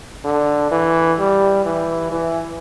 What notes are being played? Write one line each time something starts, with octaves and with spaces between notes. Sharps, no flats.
D3
E3
G3
E3
E3